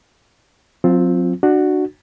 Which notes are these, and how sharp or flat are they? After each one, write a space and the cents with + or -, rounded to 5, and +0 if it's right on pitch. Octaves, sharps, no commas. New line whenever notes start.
F#3 -40 C4 +0 F4 +0
D4 +20 F#4 +0